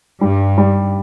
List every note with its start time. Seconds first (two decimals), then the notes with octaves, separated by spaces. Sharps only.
0.20 G2 G3
0.58 G3